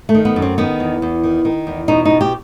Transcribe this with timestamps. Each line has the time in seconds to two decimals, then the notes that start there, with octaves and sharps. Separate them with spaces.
0.09 A3
0.14 D#3
0.25 B3
0.36 F#2
0.42 C4
0.58 D#3 B3
0.80 E2
1.02 E2
1.24 D#3
1.45 D#3
1.67 E2
1.88 B2 D#4
2.05 E2 D#4
2.21 G4